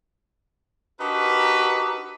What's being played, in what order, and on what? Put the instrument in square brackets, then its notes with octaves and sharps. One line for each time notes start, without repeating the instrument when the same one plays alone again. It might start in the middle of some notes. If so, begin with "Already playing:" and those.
[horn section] D4 D#4 F#4 G4 A#4 B4